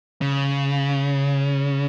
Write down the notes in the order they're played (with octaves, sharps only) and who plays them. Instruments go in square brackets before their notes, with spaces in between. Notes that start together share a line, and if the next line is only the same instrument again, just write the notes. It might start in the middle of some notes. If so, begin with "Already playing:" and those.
[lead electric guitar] C#3